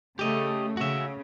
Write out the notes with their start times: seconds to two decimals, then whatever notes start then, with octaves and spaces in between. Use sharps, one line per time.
0.19 C#3 A3 G4 D#5
0.77 C#3 F#4 E5